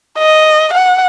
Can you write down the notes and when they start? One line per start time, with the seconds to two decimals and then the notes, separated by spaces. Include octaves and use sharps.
0.18 D#5
0.73 F#5